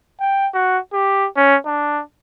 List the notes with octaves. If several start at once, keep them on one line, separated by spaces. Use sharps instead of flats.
G5
F#4
G4
C#4
D4